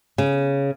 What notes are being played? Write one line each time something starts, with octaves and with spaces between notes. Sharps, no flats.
C#3